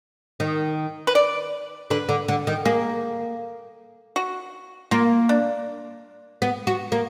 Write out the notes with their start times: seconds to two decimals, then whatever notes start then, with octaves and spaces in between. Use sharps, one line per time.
0.40 D#3
1.07 B4
1.15 D5
1.90 D3 B4
2.09 D3
2.28 D3
2.47 D#3
2.65 A#3 G#4
4.16 F#4
4.91 A#3 F4
5.29 D4
6.42 B3
6.67 F#4
6.92 A#3